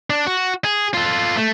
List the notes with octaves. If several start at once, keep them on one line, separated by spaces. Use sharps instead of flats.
D4
F#4
G#4
F4 A4
A3